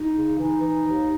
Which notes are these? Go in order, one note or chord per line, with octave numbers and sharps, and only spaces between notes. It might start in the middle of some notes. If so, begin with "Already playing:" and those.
Already playing: D#4
C#3
E3 D#4
E3
D#2